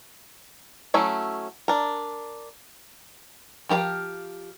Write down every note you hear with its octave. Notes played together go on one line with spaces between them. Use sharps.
F#3 A3 C#4 E4
D4 A#4
F3 G4 A#4 F5